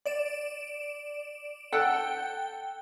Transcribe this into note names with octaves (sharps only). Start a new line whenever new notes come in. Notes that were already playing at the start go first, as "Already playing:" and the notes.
D5 D7 E7
A4 F#5 G5